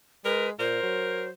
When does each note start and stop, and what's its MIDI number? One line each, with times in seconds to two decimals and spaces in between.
0.25 0.52 56
0.25 0.47 70
0.25 0.50 71
0.59 0.80 46
0.59 1.23 70
0.59 1.29 72
0.83 1.30 54